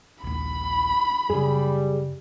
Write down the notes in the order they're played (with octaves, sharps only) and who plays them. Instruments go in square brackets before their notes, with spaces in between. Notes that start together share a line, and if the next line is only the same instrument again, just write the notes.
[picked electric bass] A#1 D#2 [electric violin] B5
[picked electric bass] F#2 C#3 [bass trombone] G3 [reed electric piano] G#4